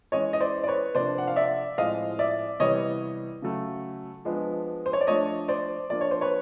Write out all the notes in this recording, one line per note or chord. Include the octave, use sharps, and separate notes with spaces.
E3 G#3 C#4 C#5 D#5
D#5
C5 D5
D5
B4 C#5
C3 F3 A#3 D4 C5 D5
F#5
F5
D5 E5
A2 F3 G#3 C4 D#5 F5
D5 E5
C3 E3 G3 B3 C#5 D#5
C#3 F#3 A3
F3 G#3 B3 D4
C5
C#5
D5
F3 A3 D4 C#5 D#5
C5 D5
F3 A#3 D4 D5
C#5
C5
B4 C#5